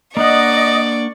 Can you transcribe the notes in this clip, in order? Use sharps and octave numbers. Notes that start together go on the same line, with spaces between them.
A#3 D4 D5 D#5 F#5 C#6 D#6